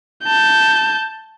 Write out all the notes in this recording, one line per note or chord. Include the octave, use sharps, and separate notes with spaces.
A5 G6